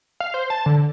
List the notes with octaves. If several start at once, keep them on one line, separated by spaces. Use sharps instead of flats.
F5
C5
A5
D3